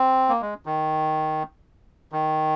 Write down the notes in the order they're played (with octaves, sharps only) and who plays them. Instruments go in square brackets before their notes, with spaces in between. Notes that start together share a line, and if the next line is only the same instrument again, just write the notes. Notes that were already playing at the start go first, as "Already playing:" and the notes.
Already playing: [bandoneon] C4
A#3
G#3
D#3
D#3